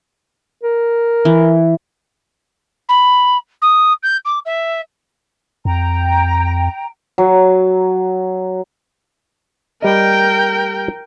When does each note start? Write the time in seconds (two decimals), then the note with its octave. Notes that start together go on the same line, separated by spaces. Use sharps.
0.64 A#4
1.25 E3
2.88 B5
3.62 D#6
4.03 G6
4.25 D6
4.45 E5
5.65 F2 G5 A#5
7.18 F#3
9.82 G3 A#4 D#5 G5